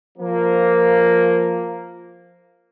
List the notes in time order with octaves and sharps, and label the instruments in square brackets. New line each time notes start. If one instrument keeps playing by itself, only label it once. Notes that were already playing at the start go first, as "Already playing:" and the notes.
[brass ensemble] F3 A#3